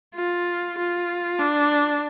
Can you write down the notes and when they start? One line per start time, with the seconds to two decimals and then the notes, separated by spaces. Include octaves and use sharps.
0.15 F4
0.78 F4
1.39 D4